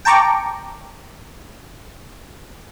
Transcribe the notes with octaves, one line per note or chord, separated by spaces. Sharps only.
G5 A5 A#5 C#6 D6